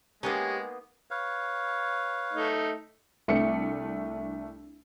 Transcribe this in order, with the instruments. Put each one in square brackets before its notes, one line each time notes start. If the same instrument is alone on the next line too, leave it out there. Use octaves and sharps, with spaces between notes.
[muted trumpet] G#3 [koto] A#3 B3 D#4 [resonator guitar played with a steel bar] C#4 [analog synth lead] G4
[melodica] B4 C#5 F5
[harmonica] A3 D#4
[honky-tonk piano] C2 A3 D4 C#7